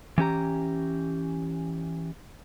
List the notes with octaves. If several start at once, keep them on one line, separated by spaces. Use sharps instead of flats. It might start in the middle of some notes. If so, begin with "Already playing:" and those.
E3 C#4 G4 A#5